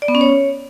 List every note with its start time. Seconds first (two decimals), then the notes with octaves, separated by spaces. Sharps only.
0.02 D5
0.08 B3
0.15 C#4
0.21 C#5